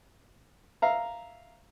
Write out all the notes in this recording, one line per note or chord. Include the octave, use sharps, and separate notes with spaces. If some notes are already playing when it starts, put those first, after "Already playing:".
E5 F5 A#5